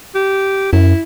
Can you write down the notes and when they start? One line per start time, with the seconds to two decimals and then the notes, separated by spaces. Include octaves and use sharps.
0.15 G4
0.73 F#2 E4